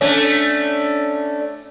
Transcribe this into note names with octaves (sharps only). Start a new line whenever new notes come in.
A3 C#4 D4